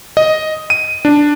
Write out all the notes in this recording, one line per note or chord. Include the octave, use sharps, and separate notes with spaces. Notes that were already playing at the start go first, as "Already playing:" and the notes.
D#5
D#7
D4